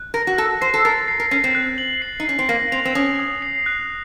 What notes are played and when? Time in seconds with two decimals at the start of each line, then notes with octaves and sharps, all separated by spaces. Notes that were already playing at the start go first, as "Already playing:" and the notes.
Already playing: F#6
0.14 A#4 A#6
0.27 F#4
0.38 A4 F#6
0.61 C5 C7
0.74 A4
0.85 A#4 A6
1.08 C7
1.20 A#4
1.31 C#4 C7
1.44 C4
1.55 F#6
1.78 F#7
2.02 C7
2.20 D#4
2.25 C#4 C7
2.39 C4
2.49 A#3 A#6
2.72 C4 F7
2.85 C4
2.95 C#4 D#6
3.19 D#6
3.42 C7
3.66 F#6